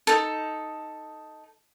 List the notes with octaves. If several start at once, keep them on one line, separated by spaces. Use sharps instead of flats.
D#4 A4